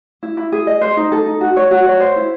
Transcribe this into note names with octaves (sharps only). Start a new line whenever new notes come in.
E4
E4
G#4
D#5
C5
D#4
A4
D#4
F#4
C#5
F#4
C#5
C5
E4